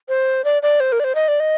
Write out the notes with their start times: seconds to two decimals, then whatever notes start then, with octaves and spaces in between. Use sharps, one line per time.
0.09 C5
0.44 D5
0.62 D5
0.80 C5
0.92 A#4
1.00 D5
1.04 C5
1.15 D#5
1.28 D5
1.40 D#5